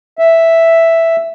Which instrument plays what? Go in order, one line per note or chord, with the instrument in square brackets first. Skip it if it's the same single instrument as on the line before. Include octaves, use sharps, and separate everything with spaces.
[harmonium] E5